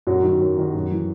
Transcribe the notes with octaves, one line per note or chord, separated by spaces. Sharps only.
F#2 F#3 F#4
D#3 F#3
F#2
D#3 F#3
F#2
E3